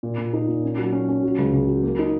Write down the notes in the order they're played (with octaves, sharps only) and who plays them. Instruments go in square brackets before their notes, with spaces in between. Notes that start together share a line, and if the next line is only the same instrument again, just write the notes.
[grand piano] A#2
A#2
D#4
A#2
C#4
F#3
C#4
C#4
F#3
C#2
C#3
F#3
A#3
D#4